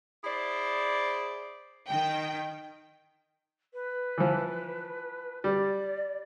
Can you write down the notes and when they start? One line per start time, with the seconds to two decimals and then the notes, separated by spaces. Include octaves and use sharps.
0.24 E4 G#4 C5 D5
1.88 D#3 G5
3.73 B4
4.18 E3 F3
5.44 G3 D5